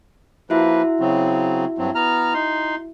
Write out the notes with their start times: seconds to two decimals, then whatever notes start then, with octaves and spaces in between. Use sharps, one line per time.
0.50 F3 A#3 E4 F#4 B4 E5
1.00 C#3 F#3 C4
1.78 G2 F#3 C4
1.95 B3 A#5 F6
2.34 D#4 C6